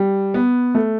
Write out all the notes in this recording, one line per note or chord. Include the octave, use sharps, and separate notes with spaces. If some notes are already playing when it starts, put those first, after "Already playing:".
Already playing: G3
B3
A3